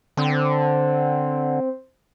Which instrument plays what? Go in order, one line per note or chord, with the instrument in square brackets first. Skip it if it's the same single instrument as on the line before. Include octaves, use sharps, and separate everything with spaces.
[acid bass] D3 [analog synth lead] C4